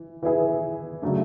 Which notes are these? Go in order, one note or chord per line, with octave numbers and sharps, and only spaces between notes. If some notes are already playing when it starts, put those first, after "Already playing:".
Already playing: E3
E3 B3 E4 G#4
C#3 F#3 A3 D4